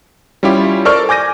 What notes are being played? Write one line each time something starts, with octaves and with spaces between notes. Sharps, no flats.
G3 C#4 E4 F4 G4
A4 A#4 C5 D5 C#6 F6
G#5 D6 G6 A#6 D#7